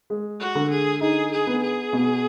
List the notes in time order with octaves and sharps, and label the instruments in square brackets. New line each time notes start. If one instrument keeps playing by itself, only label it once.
[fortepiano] G#3
[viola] F#4
[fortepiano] D3
[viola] G#4
[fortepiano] D#4 [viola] G#4
[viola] G#4
[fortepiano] B3
[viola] G#4
[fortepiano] B2